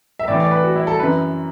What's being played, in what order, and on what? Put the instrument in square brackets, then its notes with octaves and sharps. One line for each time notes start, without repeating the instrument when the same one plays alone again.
[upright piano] E5
A2 E3 D5
D5
B4
F#4
E4
A4
F#2 E3 B4